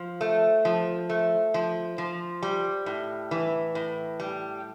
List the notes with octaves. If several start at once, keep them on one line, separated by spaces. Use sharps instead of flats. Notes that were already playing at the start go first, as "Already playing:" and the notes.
Already playing: F3
A3
F3
A3
F3
F3
G3
A2
E3
A2
G3